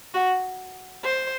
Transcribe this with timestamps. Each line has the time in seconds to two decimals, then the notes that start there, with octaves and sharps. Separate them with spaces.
0.14 F#4
1.04 C5